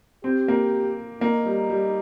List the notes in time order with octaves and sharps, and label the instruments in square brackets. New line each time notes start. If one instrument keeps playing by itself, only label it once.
[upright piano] C4 [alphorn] G4
[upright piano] A#3
[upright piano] A#3 [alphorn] D#4
[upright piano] G3
G3